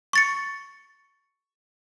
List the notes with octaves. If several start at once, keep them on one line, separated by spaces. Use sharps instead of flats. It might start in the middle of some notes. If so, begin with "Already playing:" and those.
C#6 A6 C#7